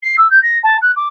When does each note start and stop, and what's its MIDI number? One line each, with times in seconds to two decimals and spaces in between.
0.02 0.14 96
0.17 0.29 88
0.30 0.41 91
0.42 0.58 94
0.63 0.76 81
0.81 0.91 90
0.96 1.08 86